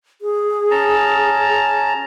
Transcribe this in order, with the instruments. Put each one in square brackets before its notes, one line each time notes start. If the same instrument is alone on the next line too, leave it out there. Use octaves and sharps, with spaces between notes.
[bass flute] G#4
[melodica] C#4 A5 A#5